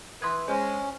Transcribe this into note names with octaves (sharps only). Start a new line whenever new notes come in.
E3 B4 C6 D#6 G#6
G#3 C#4 C5